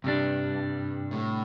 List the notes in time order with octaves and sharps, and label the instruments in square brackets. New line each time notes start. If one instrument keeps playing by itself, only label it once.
[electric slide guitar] G2 [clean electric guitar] C3 G3 D4
[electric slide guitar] A2